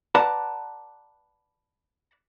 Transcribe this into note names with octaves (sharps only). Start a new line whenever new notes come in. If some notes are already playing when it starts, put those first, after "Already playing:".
B4 D5 F#5 A5 A#5